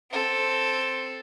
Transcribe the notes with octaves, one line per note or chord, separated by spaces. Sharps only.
C4 A4